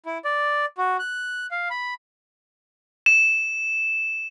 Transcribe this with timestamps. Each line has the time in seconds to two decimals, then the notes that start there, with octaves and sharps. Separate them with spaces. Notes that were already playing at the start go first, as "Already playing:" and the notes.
0.06 E4
0.25 D5
0.78 F#4
0.99 F#6
1.51 F5
1.70 B5
3.06 E7